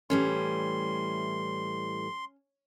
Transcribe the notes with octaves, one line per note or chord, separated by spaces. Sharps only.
A2 E3 G3 C#4 C6